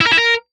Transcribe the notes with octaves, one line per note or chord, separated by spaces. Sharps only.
E4
A#4
E4
A#4